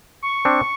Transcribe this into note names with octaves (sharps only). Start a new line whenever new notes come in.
C#6
C4 D4